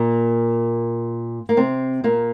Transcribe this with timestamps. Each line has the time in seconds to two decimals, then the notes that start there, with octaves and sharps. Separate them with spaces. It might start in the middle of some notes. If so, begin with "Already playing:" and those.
Already playing: A#2 A#3
1.49 A#3
1.57 C3 C4
2.04 A#2 A#3